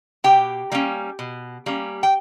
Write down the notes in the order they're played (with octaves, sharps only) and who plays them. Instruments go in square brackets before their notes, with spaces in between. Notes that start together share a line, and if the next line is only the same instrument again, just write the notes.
[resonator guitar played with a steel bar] B2 G4 G5
G3 A#3 C#4
B2
G3 A#3 C#4
G5